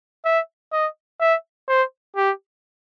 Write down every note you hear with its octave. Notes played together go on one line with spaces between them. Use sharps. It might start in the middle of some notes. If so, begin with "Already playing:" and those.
E5
D#5
E5
C5
G4